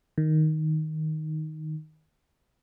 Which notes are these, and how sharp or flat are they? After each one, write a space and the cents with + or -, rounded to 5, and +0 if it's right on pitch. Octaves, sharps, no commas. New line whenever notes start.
D#3 +0